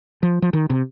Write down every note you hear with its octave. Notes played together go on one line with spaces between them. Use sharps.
F3
F3
D#3
C3